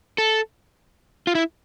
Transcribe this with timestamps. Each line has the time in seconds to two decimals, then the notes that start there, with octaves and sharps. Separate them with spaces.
0.18 A4
1.27 F4
1.35 E4